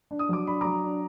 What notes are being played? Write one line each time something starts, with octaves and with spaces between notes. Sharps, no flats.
D4
D#6
F#3 D6
D4 B5
F#3 A#5 D6
D4